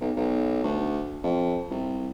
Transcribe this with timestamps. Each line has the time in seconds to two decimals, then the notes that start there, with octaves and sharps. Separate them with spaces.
0.01 B1
0.16 B1
0.63 D2
1.23 F2
1.70 C2